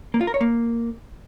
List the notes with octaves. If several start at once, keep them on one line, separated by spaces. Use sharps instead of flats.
A#3
F4
A#4
C#5
A#3